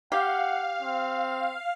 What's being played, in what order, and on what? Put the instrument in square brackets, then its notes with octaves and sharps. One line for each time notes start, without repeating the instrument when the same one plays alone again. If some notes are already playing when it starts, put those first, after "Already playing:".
[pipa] G4 [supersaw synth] F5 [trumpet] F#5
[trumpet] C4